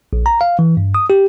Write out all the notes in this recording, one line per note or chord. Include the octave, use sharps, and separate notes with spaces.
A#1
A#5
F5
E3
G2
D#6
G4